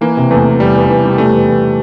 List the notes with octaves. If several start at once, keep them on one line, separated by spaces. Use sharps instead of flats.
E3 A#3
C3
E2 A3
E2
E2 G3
E2
E3
G3
G3 A3
E2
E3